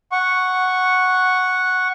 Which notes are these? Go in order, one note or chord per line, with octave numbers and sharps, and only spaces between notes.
F#5 C#6